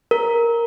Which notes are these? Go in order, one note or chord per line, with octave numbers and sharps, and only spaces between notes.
A#4